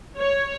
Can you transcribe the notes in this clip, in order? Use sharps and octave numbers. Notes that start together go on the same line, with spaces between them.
C#5